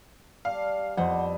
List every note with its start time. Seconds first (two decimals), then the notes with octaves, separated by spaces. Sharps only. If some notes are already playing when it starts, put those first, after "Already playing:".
0.45 G3 D4 F5
0.97 F2 B3 D4 E4 C5 F#5